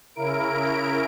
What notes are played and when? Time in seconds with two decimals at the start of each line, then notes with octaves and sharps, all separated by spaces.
0.15 C#3 E4 A#4 D7